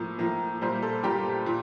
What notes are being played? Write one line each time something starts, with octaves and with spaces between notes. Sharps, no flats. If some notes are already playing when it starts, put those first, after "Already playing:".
Already playing: A2 F3 A#3
A2 F3 A#3
A#2 G3 A#3 C5
A4
A#2 G3 A#3 G4
A#2